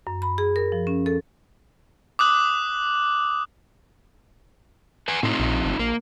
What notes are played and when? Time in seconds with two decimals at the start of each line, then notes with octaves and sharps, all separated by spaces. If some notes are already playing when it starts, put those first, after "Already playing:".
0.07 F#2
0.22 B5
0.38 G#4
0.56 A#4
0.72 F3
0.87 C#4
1.06 A4
2.19 D6 D#6 F#6 F#7
5.08 B4 F#5 G#5
5.23 A2 C4 D#4 F4
5.39 A#1
5.65 G1
5.79 A#1 A#3